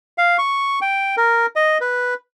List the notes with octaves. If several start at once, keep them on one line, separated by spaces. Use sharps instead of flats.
F5
C#6
G5
A#4
D#5
B4